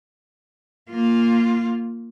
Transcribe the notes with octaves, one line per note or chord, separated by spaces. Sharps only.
A#3 F4